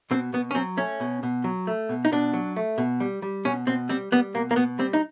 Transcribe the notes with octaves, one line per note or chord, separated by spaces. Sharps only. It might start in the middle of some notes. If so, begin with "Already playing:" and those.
B2 C4
B2 B3
C#4
F#3 C4
A3 C#4
B2
B2
F#3
A3
B2
D#4
B2 D4
F#3
A3
B2
G3
G3
B2 C#4
B2 C4
G3 C4
G3 B3
B2 A#3
A#3
B2 B3
G3 C4
D#4